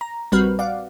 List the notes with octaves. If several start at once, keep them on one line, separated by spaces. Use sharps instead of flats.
A#5
A#1 G3 C4 F#4 B4 F6
D5 F5 F#5